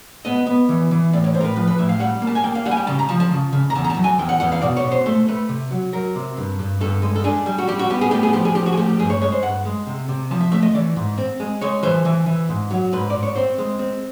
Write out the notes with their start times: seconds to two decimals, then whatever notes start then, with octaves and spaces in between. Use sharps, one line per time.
0.25 B3 D#5
0.47 B3
0.69 E3
0.91 E3
1.13 A2 D5
1.24 C#5
1.34 A2 C5
1.41 A#4
1.45 B4
1.56 F3 B4
1.68 B4
1.78 A2 E5
1.89 F5
2.00 G3 F#5
2.22 A#3
2.27 A5
2.35 G#5
2.43 A#3 G5
2.55 F5
2.66 G3 F#5
2.71 G#5
2.77 G5
2.87 C#3 A5
2.99 A#5
3.09 F3 A5
3.20 A5
3.31 C#3
3.53 C#3
3.70 A#5
3.75 E2 A5
3.85 A#5
3.90 A5
3.96 F#3
4.04 G#5
4.19 E2 G5
4.29 F#5
4.40 E2 F#5
4.52 F5
4.62 B2 D5
4.77 C#5
4.85 B2
4.92 C5
5.06 A3 C5
5.28 A3 B4
5.49 C3
5.71 F#3
5.93 F#3 A#4
6.16 C3
6.37 G2
6.59 G2
6.81 G2 A4
7.02 G#3
7.16 A4
7.24 D4 G#4
7.46 G3
7.58 F#4
7.67 G3 G4
7.79 F#4
7.90 B3 G4
8.01 G#4
8.11 A3 G4
8.23 G#4
8.33 F3 G4
8.45 G#4
8.55 F3 G4
8.66 F#4
8.72 G#4
8.77 A3 G4
8.89 G4
8.99 G2 G#4
9.10 C#5
9.22 G#3 C#5
9.32 C5
9.42 G2 F#5
9.65 G#3
9.87 C3
10.09 C3
10.31 F3 A5
10.41 E5
10.51 A3 E5
10.62 D#5
10.74 E3 D5
10.96 G#2
11.18 C4
11.40 G#3
11.61 G#3 C#5
11.83 E3 C5
12.05 E3
12.26 E3
12.49 G#2
12.71 F#3
12.92 G#2 B4
13.10 G#2 D5
13.23 C#5
13.36 C4 C5
13.58 G#3
13.79 C4